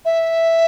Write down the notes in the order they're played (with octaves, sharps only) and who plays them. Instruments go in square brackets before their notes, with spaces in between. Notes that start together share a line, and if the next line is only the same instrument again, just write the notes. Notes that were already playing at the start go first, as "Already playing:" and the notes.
[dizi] E5